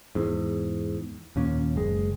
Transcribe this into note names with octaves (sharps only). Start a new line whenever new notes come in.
E2 G#2
D#2 A#2 C#4
F#1 G#3